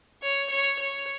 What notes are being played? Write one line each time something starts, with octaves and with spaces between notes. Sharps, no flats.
C#5
C#5
C#5